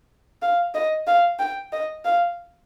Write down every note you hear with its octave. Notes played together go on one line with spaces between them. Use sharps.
F5
D#5
F5
G5
D#5
F5